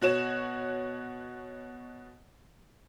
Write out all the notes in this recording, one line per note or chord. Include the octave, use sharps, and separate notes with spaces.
B2 F#4 C#5 E7